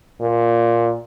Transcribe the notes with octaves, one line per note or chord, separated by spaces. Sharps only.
A#2